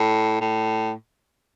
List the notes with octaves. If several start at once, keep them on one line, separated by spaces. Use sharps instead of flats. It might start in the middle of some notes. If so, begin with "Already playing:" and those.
Already playing: A2
A2